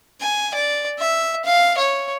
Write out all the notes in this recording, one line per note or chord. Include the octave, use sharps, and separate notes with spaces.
G#5
D5
E5
F5
C#5